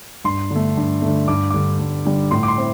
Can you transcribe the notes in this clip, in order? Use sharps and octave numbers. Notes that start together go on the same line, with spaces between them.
G2 C6
D3 A3
G2
D3 A3
G2 D6
D3 G3 D6
G2
D3 G3
A2 C6
D6
C6
C4 E4